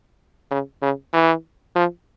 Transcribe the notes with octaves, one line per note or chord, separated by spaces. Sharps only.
C#3
C#3
E3
F3